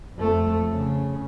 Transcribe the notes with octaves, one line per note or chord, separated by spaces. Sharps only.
F2 A3
C#3